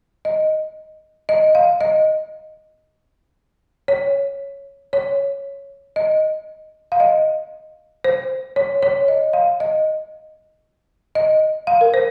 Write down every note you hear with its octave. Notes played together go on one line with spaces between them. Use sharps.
D#5
D#5
F5
D#5
C#5
C#5
D#5
F5
D#5
C5
C#5
C#5
D#5
F5
D#5
D#5
F5
A#4
C5